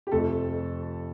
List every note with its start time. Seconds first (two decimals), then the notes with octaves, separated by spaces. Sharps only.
0.07 G4
0.12 F1 F2 F3 A3 C4 A4